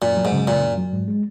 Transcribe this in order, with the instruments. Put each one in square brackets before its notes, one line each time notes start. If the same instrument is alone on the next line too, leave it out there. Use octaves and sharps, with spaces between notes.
[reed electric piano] F#2 [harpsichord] A#2
[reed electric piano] F#3
[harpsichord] G#2
[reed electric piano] C#3
[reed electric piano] F#2 [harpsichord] A#2
[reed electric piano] F#2
F#3
G#2
G#3